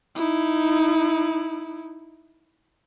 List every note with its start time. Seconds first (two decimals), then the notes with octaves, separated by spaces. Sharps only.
0.16 D#4 E4